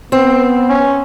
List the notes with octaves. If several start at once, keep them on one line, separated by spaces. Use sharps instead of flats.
B3 C4
C#4